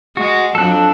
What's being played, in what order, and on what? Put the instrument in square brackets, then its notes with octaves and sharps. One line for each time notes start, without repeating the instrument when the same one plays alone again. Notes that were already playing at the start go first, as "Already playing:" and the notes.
[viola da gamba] G#3 [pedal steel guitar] F#4
[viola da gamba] F2 F#3 D4 [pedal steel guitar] A4 F#6